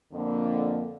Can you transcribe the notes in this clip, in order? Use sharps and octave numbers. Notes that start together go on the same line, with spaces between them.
F2 D3 A#3